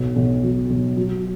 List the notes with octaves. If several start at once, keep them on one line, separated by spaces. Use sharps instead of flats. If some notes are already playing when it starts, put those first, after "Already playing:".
Already playing: B1 B2
B1
F#3
B1
F#3